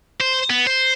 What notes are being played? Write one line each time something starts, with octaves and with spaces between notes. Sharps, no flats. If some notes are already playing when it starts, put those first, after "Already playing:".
C5
B3
C5